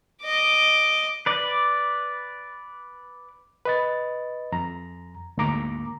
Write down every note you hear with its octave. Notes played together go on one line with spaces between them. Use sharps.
D#5 D6
B4 D5
B4 D#5 A6
F2 A#5
D2 G#2 A#3 A#5 D6